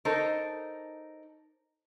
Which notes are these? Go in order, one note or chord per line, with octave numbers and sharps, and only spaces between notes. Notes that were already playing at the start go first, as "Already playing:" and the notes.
D#4 A4 A#4 C5 C#5